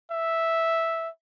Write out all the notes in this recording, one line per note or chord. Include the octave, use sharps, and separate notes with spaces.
E5